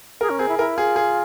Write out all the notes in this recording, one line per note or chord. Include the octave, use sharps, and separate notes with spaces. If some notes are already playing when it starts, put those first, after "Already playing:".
G#4 A#4
C#4
C4 G#4
E4
E4 A#4
F4 G#4
G#4